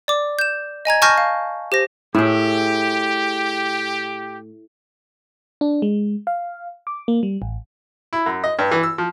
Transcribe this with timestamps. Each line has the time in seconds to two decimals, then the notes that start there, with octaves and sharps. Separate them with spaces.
0.08 D5 D6
0.39 G6 E7
0.85 D#5 G#5 A#5 G#6
1.02 G#5 A5 C#6 F6 G6 A#6
1.18 F5
1.72 G4 C5 A#6
2.15 A2 E4 G4 G#4
5.61 D4
5.82 G#3
6.27 F5
6.87 D6
7.08 A#3
7.23 G3
7.42 A1
8.13 E4
8.26 F#2
8.44 D#5
8.59 G2
8.71 E3
8.83 E6
8.98 F3